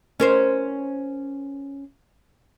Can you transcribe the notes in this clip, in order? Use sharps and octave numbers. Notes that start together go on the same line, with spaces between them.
C#4 A#4 C5